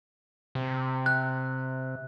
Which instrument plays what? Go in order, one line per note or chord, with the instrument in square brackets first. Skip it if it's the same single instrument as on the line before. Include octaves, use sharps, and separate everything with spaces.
[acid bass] C3
[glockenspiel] F#6